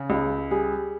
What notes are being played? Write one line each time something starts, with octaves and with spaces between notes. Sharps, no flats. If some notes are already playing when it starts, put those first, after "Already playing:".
Already playing: C#3 G#4
C#2
G3 G#4